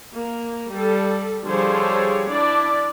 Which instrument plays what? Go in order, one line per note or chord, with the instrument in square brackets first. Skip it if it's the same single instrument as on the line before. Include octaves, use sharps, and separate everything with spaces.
[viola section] A#3
G3 A4
D3 F3 G3 G#4 C5 C#5
D4 E4 D5